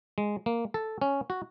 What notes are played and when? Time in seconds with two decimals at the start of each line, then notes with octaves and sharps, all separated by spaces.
0.18 G#3
0.46 A#3
0.74 A4
1.01 C#4
1.30 F#4